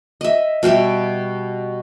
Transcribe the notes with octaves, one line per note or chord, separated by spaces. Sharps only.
D#5 E5
B2 G3 G4 E5